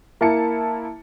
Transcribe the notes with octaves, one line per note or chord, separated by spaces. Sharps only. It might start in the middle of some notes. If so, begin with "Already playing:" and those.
A#3 E4 A5 C#7